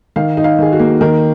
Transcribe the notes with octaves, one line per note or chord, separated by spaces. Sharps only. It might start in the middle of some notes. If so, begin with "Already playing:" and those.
D#3 F5
D#4
F5
D#3 G#4
F#4
A#3
D#3 A#4